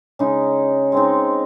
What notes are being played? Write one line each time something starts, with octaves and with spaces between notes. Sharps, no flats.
C#3 G#3 D#4
G#3 C4 D#4